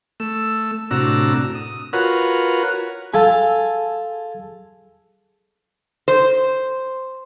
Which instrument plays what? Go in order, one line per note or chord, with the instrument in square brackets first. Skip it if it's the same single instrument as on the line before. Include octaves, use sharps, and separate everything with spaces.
[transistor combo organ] A3 E6
A2 C3 D4 F#4 A#5 E6
D#6
F4 F#4 A#4 B4 C#5 F#5
[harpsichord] F4 A4 G#5 [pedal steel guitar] G#4 A5 E6
[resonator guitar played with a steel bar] C5